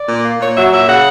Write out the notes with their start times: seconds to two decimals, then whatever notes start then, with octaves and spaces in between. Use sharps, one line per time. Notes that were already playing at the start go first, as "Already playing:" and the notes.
Already playing: D5
0.08 A#2
0.24 A#3
0.40 A#2 C#5
0.56 F#3 E5
0.71 A#2 E5
0.87 C#3 F#5